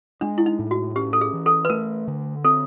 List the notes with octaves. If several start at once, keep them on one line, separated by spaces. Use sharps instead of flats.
G#3 D4
E4
D#4
A2
F#4
C#4 G4
A4
G#4
E3
A4
B4
A3 A#4
D3
C4 A4